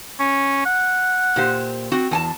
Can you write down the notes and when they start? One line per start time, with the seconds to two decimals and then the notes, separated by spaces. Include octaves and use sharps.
0.20 C#4
0.66 F#5
1.36 A#2 G4 C5
1.92 C4 F#4
2.11 E2 G#5 A5